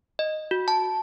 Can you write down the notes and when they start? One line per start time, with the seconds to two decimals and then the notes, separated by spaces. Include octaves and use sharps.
0.19 D#5
0.51 F#4
0.68 A5